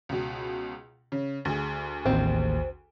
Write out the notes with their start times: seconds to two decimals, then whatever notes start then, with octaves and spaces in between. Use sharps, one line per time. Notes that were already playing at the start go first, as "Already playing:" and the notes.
0.09 C#2 B2
1.12 C#3
1.45 D2 G#4
2.06 A1 D#2 C4